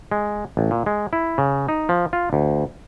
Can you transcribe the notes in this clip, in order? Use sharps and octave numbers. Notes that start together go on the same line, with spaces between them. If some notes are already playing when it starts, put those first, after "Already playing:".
G#3
A1
A#2
G#3
E4
C#3
D#4
F3
F4
D2